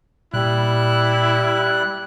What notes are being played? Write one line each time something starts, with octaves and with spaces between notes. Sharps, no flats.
A#2 G3 E4 F#6